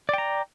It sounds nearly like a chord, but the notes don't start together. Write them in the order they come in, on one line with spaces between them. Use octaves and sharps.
D5 G5 A#5